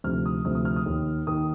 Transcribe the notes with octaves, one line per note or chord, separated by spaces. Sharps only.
D2 C3 F3 F6
D#6
D2 C3 F3 D#6
D#6
F6
D#6
D#2 D#3
D#2 D#3 D#6